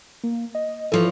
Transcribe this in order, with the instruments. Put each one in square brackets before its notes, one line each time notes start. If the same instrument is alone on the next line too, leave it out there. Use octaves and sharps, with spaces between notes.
[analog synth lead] A#3
D#5
[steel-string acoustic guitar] E3 F3 C#5 [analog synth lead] A4